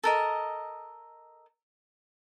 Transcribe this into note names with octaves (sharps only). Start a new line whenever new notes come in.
A4 A#4 D#5